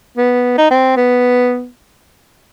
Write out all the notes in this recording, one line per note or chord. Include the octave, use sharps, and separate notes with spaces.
B3
D#4
C4
B3